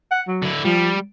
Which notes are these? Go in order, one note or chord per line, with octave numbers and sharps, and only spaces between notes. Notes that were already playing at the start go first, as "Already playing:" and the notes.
F#5
F#3
D3 E4
F3 G3